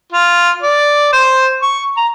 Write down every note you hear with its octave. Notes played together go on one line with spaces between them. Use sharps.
F4
D5
C5
C#6
A#5